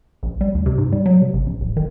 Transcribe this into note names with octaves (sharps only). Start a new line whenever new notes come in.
A#1
G3
D2
C3
G#2
G3
F#3
C3
G#1
A#1
D1
D#3